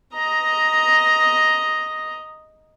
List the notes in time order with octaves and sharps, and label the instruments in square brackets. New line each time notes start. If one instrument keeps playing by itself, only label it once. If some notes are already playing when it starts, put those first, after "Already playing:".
[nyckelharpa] D#5 A#5